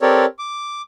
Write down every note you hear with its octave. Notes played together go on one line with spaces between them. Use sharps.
C4 G4 A4 A#4 C#5 D5
D6